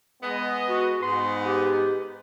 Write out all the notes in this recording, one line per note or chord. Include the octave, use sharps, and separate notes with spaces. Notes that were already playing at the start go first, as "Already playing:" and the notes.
G#3 B3 D#5
F#4
G#2 B3 C6
G4